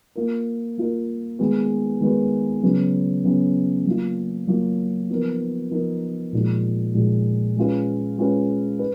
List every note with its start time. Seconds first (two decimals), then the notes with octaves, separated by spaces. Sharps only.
0.16 A#3 F4 A#4
0.78 A#3 F4 A#4
1.39 D#3 G#3 B3 F#4 B4
2.01 D#3 G#3 B3 F#4 B4
2.62 C#3 F#3 B3
3.24 C#3 F#3 B3
3.86 F#3 A#3 F4
4.47 F#3 A#3 F4
5.10 F3 B3 D#4 A#4
5.71 F3 B3 D#4 A#4
6.33 A#2 F3 G#3 D#4 F#4
6.94 A#2 F3 G#3 D#4 F#4
7.56 G#3 C#4 F4 B4
8.18 G#3 C#4 F4 B4
8.79 B4